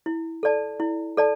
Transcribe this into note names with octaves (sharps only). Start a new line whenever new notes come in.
E4
A4 D5 A5
E4
A4 D5 A5